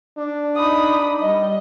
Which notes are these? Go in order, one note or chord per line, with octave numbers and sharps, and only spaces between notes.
D4
D#4 B5 D#6
G3 D#5